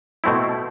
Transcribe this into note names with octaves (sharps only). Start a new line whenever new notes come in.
B2 A3 C4 E4